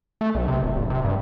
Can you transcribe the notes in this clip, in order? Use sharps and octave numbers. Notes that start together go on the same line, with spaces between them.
A3
B1
C3
D1
D1
C3
G2